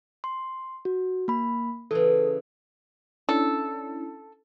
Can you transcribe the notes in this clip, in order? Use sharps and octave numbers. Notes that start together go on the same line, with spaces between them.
C6
F#4
A#3 B5
C#3 E3 A4
C#4 D4 E4 A4